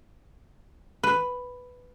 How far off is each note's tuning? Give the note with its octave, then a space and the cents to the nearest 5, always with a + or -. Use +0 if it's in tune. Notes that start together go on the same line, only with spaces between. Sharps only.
B4 +5